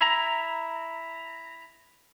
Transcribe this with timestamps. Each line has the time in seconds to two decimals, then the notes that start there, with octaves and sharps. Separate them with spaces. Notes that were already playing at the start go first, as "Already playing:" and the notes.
0.01 E4 A#5